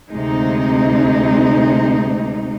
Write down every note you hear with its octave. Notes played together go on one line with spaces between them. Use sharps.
D2 C3 G#3 D#4